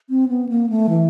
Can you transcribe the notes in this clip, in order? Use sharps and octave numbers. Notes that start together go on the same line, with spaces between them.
C4
B3
A#3
A3
E3